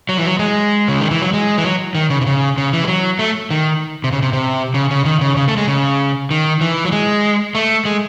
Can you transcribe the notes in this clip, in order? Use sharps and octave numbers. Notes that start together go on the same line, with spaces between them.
F#3
E3
F#3
G#3
C#3
D#3
E3
F#3
G#3
E3
F#3
D#3
C#3
C3
C#3
C#3
E3
G#3
F#3
A3
D#3
C3
C#3
C3
C3
C#3
C#3
D#3
C#3
C#3
A3
G#3
C#3
D#3
E3
F#3
G#3
A3
G#3